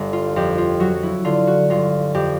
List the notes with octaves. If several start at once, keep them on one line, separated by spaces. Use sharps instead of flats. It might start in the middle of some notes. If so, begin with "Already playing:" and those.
Already playing: G1
F4
F2 G4
F4
F#3 F#4
E4
D3 F4
F#4
G1 F4
F2 G4